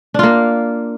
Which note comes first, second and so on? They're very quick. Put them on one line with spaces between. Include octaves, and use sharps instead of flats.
D4 F4 A#3